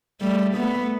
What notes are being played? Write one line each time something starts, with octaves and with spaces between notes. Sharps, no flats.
G3 A3
A3 B3